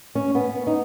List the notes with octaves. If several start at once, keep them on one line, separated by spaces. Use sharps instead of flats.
C#4
B3
D#4